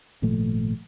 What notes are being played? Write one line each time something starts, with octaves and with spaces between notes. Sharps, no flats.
G#1 A#2 F3 A3